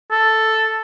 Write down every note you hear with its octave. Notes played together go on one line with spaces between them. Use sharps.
A4